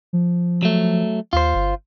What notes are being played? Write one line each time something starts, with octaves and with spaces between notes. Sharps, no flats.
F3
F#3 A3
D#2 F4 C5
G1